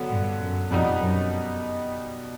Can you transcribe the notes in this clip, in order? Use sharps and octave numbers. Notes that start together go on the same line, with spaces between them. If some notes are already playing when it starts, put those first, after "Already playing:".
Already playing: D3 F#3 B3
G2
F#2
F2 B2 G3 B3 D#4
F#2